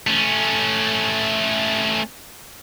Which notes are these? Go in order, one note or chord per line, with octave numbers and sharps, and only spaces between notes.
A3 C#4